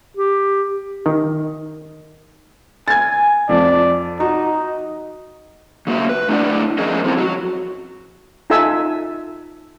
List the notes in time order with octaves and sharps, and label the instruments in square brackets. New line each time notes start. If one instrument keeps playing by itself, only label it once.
[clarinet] G4
[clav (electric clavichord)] D#3
[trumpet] G#5 [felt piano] G#6 A6
[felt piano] F2 F3 [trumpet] D5
[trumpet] D#4 [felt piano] F#4
[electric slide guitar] C#3 A#3 F#4 E5
B4
A3 D4 E4 D5 F#5
F3 C#4 G#4 A#4 D#5 E5
F3 C4 E4 G4 A4
F#3 F#4
[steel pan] D#4 F4 A4 E5 G#5 E6